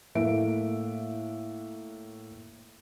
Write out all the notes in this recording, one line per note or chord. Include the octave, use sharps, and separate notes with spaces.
A2 A3 A#3 E5 D7